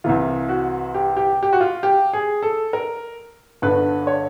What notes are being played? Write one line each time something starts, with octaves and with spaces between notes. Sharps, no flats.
C2 C3 E3 F4
F#4
G4
G4
G4
F#4
F4
G4
G#4
A4
A#4
G1 G2 D3 B4
C#5